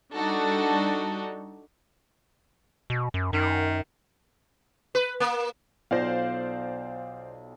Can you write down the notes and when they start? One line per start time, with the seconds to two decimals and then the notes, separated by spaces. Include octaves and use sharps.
0.15 G3 D4 D#4 F#4 A4
2.90 B2
3.14 F#2
3.33 F#2 D#3
4.95 B4
5.20 A#3
5.91 B1 F4 C5 D5 F5 A#6